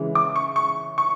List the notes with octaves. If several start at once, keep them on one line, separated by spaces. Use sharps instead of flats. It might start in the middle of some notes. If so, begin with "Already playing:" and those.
Already playing: C#3 E3 G#3
D6
C#6
C#6
C#6